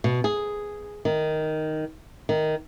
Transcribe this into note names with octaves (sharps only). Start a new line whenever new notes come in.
B2
G#4
D#3
D#3